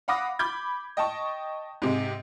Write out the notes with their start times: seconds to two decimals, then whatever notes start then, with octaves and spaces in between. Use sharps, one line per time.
0.08 F5 F#5 B5 D6 D#6 A#6
0.39 B5 D6 G6 G#6
0.97 D#5 G5 A5 C#6
1.82 G#2 C3 G#3